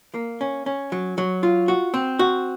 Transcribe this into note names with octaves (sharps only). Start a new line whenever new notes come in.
A#3
C#4
C#4
F#3
F#3
F4
F#4
C4
F#4